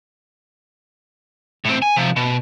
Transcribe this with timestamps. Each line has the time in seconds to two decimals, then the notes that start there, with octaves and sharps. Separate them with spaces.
1.65 A2 C4
1.82 G#5
1.96 C3 F3
2.16 B2